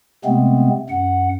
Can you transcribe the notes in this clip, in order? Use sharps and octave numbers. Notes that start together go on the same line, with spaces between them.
C3 G#3 A3 B3 C4
F#2 F#5